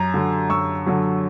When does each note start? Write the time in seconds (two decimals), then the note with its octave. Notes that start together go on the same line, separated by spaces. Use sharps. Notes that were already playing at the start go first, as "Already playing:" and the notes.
Already playing: F#2 A#5
0.14 D3 F#3
0.50 F#2 C#6 E6
0.86 D3 F#3